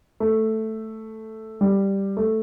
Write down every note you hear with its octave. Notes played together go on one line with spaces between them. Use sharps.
A3
G3
A3